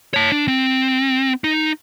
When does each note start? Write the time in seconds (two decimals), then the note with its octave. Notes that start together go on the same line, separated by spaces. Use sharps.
0.14 C#5 A5
0.32 D4
0.48 C4
1.44 D#4